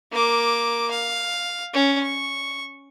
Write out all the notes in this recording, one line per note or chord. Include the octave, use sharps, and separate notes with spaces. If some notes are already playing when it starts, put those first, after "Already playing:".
A#3 D6
F5
C#4
C#6